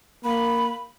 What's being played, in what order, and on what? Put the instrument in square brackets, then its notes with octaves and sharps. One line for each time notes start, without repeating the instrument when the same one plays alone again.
[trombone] A#3 [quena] B5